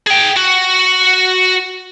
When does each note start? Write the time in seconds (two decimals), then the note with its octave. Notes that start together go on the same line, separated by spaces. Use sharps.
0.07 G#4 G5
0.36 F#4